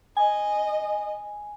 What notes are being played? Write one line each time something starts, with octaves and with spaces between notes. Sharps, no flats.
D#5 G#5